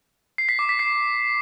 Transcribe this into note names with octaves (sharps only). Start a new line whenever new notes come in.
C7
B6
D6
B6
C7